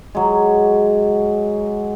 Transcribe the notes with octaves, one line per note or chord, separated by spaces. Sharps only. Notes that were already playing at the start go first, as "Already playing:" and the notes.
F#3 G#3